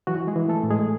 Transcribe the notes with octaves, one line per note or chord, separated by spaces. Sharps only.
E3 F#3 F#4
G#3 G#4
E3
A3 A4
A2
G#3 G#4